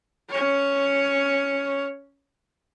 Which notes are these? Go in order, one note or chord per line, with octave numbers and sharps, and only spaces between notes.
C#4 C#5